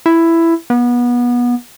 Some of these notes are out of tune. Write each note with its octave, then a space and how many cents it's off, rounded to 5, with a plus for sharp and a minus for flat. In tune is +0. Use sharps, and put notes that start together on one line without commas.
E4 +10
B3 -25